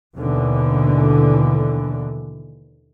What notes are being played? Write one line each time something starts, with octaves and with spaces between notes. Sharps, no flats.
D#2 B2 D3 E3